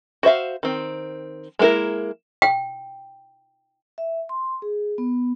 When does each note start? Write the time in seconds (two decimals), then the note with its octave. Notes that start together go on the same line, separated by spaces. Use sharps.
0.23 F#4 C5 E5 F5
0.63 D#3 C4
1.59 G#3 A#3 B3 E4 A#4
2.42 G5
3.98 E5
4.29 C6
4.62 G#4
4.98 B3